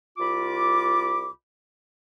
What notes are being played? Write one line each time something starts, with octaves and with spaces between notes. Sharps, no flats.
C2 F4 B5 D6